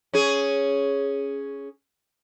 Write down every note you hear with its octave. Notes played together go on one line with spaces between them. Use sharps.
C#4 G#4